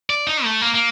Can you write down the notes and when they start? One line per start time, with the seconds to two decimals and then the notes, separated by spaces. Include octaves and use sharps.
0.10 D5
0.27 D#4
0.44 A3
0.61 A#3
0.75 A#3